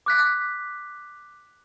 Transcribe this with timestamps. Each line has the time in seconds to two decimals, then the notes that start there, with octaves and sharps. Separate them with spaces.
0.06 D6 F#6 B6